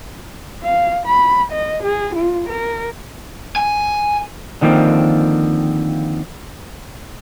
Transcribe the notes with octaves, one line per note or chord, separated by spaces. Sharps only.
F5
B5
D#5
G#4
F4
A#4
G#5
D3 D#3 F3 A#3 C4